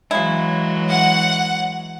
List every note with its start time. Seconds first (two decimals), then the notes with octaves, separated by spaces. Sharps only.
0.11 C#3 E3 F#3 G#3 E4
0.90 F#5